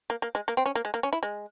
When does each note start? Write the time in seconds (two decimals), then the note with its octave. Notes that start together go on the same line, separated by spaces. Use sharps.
0.10 A#3
0.22 A#3
0.35 G#3
0.48 A#3
0.57 C4
0.66 C#4
0.75 A#3
0.85 G#3
0.94 A#3
1.03 C#4
1.13 E4
1.23 G#3